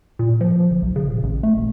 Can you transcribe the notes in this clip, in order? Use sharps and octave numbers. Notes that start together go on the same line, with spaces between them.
A#2
F3
G1
B1
C#3
D#1
A1
A3
D#1